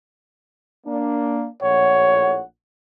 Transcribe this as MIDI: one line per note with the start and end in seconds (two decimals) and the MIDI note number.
0.87 1.46 58
0.87 1.46 62
1.62 2.41 34
1.62 2.41 45
1.62 2.41 73
1.62 2.41 78